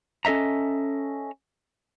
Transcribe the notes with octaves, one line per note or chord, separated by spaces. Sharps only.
C#4 A4 D#5 E5 A#5